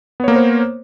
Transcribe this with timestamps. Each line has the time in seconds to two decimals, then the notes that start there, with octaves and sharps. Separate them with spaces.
0.20 B3
0.24 C#5
0.28 A#3
0.32 A#4
0.36 C5